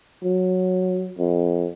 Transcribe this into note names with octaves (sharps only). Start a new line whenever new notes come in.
F#3
F2